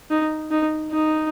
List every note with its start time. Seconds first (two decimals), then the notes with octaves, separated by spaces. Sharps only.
0.11 D#4
0.51 D#4
0.92 D#4